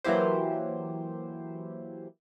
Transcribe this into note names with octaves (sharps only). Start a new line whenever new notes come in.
E3 F#3 A#3 E4 G4 C5